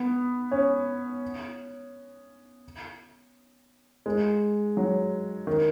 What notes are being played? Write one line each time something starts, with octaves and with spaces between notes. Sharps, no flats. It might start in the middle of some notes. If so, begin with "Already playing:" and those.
Already playing: B3
C#4
G#3
F#3
D#3